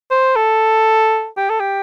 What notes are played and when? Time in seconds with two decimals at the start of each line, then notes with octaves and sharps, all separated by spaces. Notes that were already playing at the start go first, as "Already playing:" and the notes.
0.11 C5
0.36 A4
1.37 G4
1.49 A4
1.60 G4